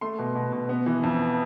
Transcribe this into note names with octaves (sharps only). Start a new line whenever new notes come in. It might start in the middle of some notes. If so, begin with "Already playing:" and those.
A3 C6
B2
B2
B2
B3
E3
F2